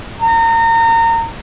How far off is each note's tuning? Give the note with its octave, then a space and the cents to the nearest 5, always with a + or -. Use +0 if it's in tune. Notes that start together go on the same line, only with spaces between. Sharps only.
A#5 -30